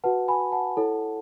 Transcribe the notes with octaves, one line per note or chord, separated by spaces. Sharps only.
F#4 B4 F#5 A5
G#5 B5
F#5 A5
E4 A4 C#5